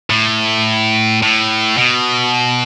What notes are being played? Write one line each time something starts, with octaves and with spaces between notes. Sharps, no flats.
A2
A2
B2